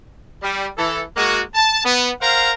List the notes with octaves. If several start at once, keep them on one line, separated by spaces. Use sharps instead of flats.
G3
E3 A4
G#3 A#3 F#4
A5
B3
A#4 C5 F5 F#5 A#5